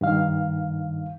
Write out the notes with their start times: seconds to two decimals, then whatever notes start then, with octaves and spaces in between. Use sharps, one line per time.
0.01 G2 D#3 F5